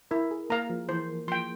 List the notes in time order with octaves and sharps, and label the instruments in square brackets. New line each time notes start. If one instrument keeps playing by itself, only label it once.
[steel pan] E4 [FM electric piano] A#4
[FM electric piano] G#4
[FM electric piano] A#3 [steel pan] A#4 F5 A#5
[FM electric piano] F3
[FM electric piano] E3 [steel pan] C5
[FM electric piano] F3 [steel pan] G5 C6